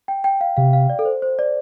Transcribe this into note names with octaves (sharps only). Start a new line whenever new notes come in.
G5
G5
F5
C3 F5
F5
D5
A4
C5
C5
D5